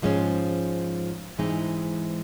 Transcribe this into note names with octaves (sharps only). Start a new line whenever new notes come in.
G#2 F3 G#3 C#4
G#2 E3 G#3 C4 D#4